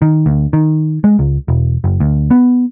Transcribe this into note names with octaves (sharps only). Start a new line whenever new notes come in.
D#3
D2
D#3
G#3
C#2
E1
F#1
D2
B3